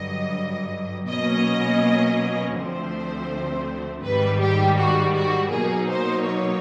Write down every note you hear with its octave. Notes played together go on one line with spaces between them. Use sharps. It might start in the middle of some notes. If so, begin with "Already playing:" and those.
Already playing: G2 D3 F#3 D#5
B2 F#3 A#3 C#4 D#5
D2 D3 F3 A3 C4 C5
G#2 D#3 G3 B4
G4
F#4
F#4
B2 F#3 A#3 D#4 G#4
C5
C#5